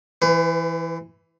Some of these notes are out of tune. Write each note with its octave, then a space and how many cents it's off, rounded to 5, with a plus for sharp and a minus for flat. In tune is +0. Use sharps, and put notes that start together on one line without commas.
E3 +0 B4 +40